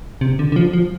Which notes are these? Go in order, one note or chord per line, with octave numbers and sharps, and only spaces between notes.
C3
D3
D3
F3
F3